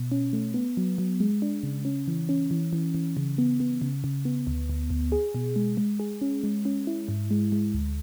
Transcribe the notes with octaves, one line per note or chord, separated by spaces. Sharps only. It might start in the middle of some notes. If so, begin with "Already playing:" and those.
Already playing: B2
C#4
A3
B3
F#3
F#3
G#3
D4
C#3
C#4
E3
C#4
E3
E3
E3
C#3
B3
B3
C#3
C#3
B3
D2
D2
D2
G#4
B2
G#3
G#3
G#4
C#4
G#3
C#4
E4
G#2
G#3
G#3
D2